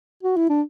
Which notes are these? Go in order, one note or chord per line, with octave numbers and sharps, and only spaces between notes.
F#4
E4
D4